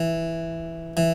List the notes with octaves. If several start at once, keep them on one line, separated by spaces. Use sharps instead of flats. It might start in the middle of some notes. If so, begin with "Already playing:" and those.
Already playing: E3
E3